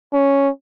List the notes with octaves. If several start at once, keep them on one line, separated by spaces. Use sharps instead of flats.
C#4